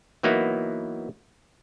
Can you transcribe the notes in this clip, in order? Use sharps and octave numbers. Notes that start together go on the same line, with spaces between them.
E3 F#3 A#3 B3 D#4 E4